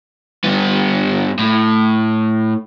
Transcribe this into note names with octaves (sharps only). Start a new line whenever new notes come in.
G2 B3
A2